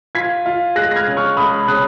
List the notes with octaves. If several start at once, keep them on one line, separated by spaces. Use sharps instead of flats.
F4 G#6 B6
F4
G#3 F#6 A#6
A#6
F6 G#6
C#3
C#6 F6
C#2 B5 D#6
C#3 D#6 F#6